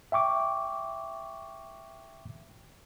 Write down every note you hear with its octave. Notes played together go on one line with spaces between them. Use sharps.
E5 G5 C#6 D6